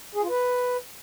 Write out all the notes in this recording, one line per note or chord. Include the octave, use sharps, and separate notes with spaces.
G#4
F4
B4